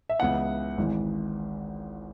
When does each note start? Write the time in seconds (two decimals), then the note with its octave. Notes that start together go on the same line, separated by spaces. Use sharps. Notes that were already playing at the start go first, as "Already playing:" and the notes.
0.09 E5
0.19 C#2 C#3 E3 B3 E4 F#5
0.77 G#1 G#2 E3